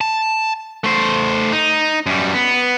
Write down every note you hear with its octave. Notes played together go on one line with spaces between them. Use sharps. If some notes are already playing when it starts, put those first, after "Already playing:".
A5
A3 C5
D#4
F#2 G3
B3